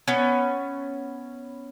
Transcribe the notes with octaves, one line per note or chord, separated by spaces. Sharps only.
B3 C#4